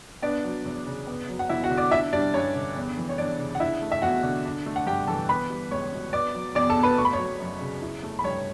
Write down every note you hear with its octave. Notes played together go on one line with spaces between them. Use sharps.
B3 D4 D5
F#3
E2
C#3
B3
F#3
F#5
E2 E4 E5
F#4 F#5
D3
D5 D6
D4 E4 E5
G3 D4 D5
G2 C#4 C#5
D3
E2
E3
C#5
E2 D4 D5
C#3
F#5
D4 E4 E5
A3
E5
E2 F#4 F#5
D3
D4
A3
F#5
G2 G4 G5
E3 A4 A5
B3 B4 B5
G3
C#2 C#5 C#6
B2
B3 D5 D6
F#3
E2 D5 D6
A4 A5
B2
B4 B5
A3 C#6
B5
C#5 C#6
F#3
F#2
C#3
E4
A3
B5
G2 C#5 C#6